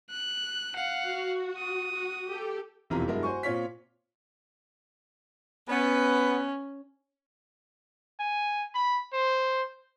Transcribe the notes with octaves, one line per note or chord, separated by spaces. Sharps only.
F#6
F5 F#5
F#4
D#6
F#4
G4 A4
E1 F2 C3 E3 F4 A#5
G2 F#3 G#3 E4 A#4
F#4 C5 G#5 C#6
A#2 C4 F4 C#5 B6
B3 C#4
G#5
B5
C5